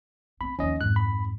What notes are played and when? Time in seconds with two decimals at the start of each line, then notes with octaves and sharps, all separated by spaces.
0.41 A3 C4 B5
0.59 D#2 F3 C#4 D#5
0.81 F2 G#2 F#6
0.96 B5